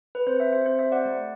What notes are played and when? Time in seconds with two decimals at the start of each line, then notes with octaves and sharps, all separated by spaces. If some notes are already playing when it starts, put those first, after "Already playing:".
0.15 B4
0.27 C4 C5
0.39 C5 E5
0.46 G4
0.53 C5
0.66 C4 C5
0.79 C5 E5
0.85 G4
0.92 D5 F#5
1.05 A3